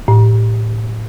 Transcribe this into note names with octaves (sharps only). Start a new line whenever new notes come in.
A2